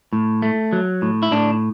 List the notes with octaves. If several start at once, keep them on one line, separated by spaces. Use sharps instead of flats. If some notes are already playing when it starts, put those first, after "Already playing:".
A2
A3
F#3
A2
E4
A2 D4